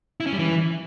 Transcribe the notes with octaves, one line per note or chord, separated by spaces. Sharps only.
E4
C#4
G3
E3